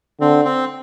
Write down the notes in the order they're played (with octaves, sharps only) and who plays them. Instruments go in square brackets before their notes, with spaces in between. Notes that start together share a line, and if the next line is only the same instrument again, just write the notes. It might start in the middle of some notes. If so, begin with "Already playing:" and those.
[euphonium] D3 [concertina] C4
[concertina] C4